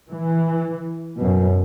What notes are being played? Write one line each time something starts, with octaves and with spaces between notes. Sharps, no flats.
E3
F#2 B2